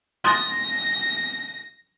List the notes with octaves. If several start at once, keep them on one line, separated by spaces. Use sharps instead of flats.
C6 D#6 A6 A#6